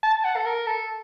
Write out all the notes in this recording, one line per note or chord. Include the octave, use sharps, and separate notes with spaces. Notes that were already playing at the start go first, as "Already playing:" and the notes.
A5
F#5
A4
A#4
A4